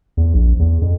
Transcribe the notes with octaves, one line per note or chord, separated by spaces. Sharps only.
E2
A#1
E2
F2